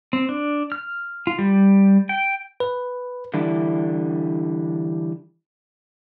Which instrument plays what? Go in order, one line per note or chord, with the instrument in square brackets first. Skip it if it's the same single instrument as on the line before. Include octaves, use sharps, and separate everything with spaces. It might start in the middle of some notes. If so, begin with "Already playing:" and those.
[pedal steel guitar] C4
D4
F6
F4
G3
G5
[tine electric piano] B4
[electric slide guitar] D3 E3 G3 D4 E4